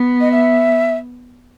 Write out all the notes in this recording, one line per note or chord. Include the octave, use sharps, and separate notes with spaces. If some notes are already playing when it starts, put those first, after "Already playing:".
Already playing: B3
D#5
E5